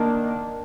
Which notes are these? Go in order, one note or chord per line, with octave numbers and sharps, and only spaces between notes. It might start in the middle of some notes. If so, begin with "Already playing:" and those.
Already playing: D#3 A#3 D4